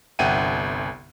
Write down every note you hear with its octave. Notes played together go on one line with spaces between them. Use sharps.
G1 C2 E5 F#5 G5 D#7